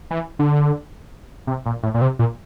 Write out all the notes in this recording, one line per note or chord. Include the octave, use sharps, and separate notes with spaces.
E3
D3
C3
A#2
A2
A#2
C3
A#2